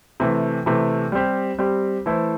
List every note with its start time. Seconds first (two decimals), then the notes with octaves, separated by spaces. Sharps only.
0.20 C3 E3 A3
0.66 C3 E3 A3
1.12 G3 C4 G4
1.59 G3 C4 G4
2.06 E3 A3 E4 A4 C5